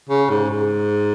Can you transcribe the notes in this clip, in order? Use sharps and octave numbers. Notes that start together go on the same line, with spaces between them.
C#3
G#2
G#2